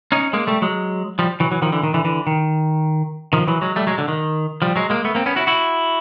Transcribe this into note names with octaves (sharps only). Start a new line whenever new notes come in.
C#4 D#4
G#3 A#3
G3 A3
F#3 G#3
F3 G3
E3 F#3
E3 F#3
D#3 F3
D3 E3
D#3
D3 E3
D3 E3
D#3
D#3 F3
E3 F#3
F#3 G#3
G3 A3
F#3 G#3
D3
D#3
F3 G3
F#3 G#3
G#3 A#3
A3 B3
A#3 C4
B3 C#4
E4 F#4
E4 F#4